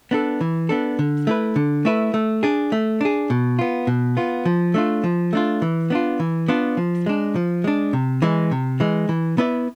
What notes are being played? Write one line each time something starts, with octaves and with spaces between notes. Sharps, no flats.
B3 D4 A4
E3
B3 D4 A4
D3
A3 E4 B4
D3
A3 E4 B4
A3
D4 G#4
A3
D4 G#4
B2
B3 F4
B2
B3 F4
F3
A3 D4 F4
F3
A3 D4 F4
E3
B3 D4 F4
E3
B3 D4 F4
F3
G#3 D4
F3
G#3 D4
C3
E3 G#3
C3
E3 G#3
E3
B3 E4 B4 D5